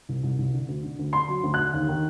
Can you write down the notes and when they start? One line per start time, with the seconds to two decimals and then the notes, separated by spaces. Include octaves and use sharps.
0.09 C2
0.23 C2
0.38 C2
0.54 D3
0.68 D2
0.83 D3
0.99 D2
1.13 D3 C6
1.28 F#3
1.43 D2
1.54 D3 F#6
1.73 D#2
1.88 D#3